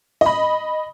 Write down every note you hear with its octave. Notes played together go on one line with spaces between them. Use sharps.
D#5 B5